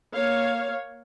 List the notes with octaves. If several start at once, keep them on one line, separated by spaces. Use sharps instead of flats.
A#3 C#5 F5